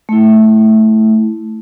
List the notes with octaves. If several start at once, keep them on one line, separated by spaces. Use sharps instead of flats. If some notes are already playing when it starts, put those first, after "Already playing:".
A3 E4